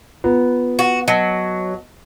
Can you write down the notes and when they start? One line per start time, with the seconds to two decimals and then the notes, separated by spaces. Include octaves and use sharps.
0.24 B3 F4
0.79 F#4
1.08 F#3 D#5 A5 A#6